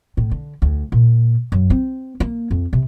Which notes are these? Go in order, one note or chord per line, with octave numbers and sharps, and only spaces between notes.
A2
D3
D2
A#2
F#2
C4
A#3
F2
C3